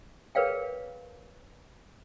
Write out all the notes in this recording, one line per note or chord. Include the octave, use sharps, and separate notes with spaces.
G#4 A#4 B4 C#5 F5 G5